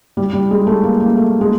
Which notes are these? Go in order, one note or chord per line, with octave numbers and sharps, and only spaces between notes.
G3
G3
G#3
A3
A#3
A#3
A3
G#3